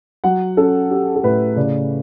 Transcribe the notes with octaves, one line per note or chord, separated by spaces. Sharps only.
F#3 F#5
C#4 A4
C#4 G4
A4
A2 B4
C#3 D5